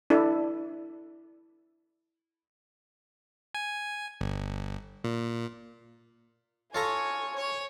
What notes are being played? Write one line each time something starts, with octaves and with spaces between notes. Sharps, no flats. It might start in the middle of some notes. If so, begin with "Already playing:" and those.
D4 E4 A4
G#5
G1
A#2
F4 A4 C#5 G#5 A#5 C#6
C#5